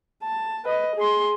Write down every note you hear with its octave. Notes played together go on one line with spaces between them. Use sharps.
A5
B4 D#5
G#4 C6